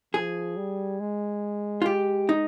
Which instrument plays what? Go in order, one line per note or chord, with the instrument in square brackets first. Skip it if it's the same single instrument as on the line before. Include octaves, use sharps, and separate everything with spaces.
[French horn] F3 [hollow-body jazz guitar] G#4
[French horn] G3
G#3
[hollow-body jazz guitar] F4
G4
D#4